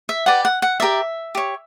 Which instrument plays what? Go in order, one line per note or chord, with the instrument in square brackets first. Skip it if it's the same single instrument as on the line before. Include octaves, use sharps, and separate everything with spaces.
[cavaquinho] E5
G4 B4 D5 F#5
F#5
F#5
G4 A#4 D5 E5
G4 C#5